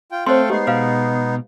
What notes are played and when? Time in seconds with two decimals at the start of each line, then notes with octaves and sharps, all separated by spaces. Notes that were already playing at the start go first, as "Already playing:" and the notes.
0.12 F4 G5
0.26 A3 C4 A4 C5 C#5 F5 G5 C6
0.50 G#3 B3 D#4 G4 C7
0.67 B2 B4 F5